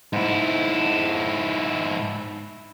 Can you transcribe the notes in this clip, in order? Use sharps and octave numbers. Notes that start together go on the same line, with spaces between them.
G#2 E4